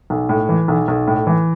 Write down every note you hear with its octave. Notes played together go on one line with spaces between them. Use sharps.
B1
A2
E3
B1
B1
A2
E3